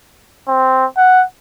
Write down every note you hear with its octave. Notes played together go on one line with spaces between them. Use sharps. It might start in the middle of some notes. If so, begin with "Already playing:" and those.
C4
F#5